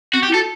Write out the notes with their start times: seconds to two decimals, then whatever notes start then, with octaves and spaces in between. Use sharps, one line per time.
0.13 C4 F#4
0.23 G4
0.28 E4
0.34 F#4 A4